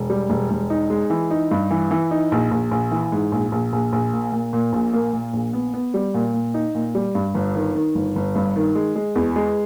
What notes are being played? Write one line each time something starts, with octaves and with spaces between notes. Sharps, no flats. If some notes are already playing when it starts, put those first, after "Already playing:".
Already playing: E1
G3
E1
E1
D#4
G#3
E3
D#4
G2
E3
E3
D#4
A#1
A#1
A#1
E3
G#2
A#1
A#1
A#1
A#1
A#2
A#2
A#2
A#1
A#3
A#2
A#1
B3
B3
G3
A#2
A#2
D#4
A#2
G3
G2
G1
D#3
D#3
G1
G1
G2
D#3
G#3
G#3
E2
G#3